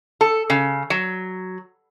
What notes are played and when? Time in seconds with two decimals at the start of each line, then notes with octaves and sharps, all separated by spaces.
0.21 A4
0.50 C#3
0.90 F#3